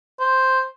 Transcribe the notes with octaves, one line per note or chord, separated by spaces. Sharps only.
C5